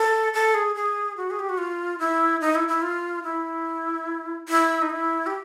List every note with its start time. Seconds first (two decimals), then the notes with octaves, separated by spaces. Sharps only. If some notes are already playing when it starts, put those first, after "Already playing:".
Already playing: A4
0.34 A4
0.54 G#4
0.75 G#4
1.17 F#4
1.30 G#4
1.39 G4
1.49 F#4
1.58 F4
1.99 E4
2.41 D#4
2.55 E4
2.68 E4
2.82 F4
3.24 E4
4.49 E4
4.82 D#4
4.90 E4
5.26 G4